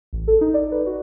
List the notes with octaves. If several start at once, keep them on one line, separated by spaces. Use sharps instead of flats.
A1
A4
D#4
D5
B4
F#4